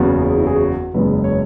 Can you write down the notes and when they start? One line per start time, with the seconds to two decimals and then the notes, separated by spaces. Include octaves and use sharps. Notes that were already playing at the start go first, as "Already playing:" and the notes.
Already playing: F#1 E2 C#3 F#3 B3
0.22 G#4
0.37 E4
0.47 G#4
0.56 F#4
0.94 F#1 E2 C#3 G#3 B3 B4
1.24 C#5